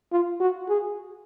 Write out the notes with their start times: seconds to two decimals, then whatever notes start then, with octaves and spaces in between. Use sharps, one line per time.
0.12 F4
0.40 F#4
0.69 G#4